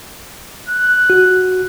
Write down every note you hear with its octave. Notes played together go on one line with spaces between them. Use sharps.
F#6
F#4